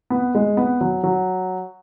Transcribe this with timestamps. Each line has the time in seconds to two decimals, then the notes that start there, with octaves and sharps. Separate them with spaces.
0.10 B3
0.35 G#3
0.57 B3
0.81 F#3
1.04 F#3